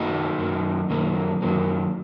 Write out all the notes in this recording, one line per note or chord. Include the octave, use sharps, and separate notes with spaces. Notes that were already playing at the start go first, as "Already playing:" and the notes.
Already playing: F#2 D#3 F#3 A#3 D#4 F#4
F#2 D#3 F#3 A#3
F#2 D#3 F#3 A#3
F#2 D#3 F#3 A#3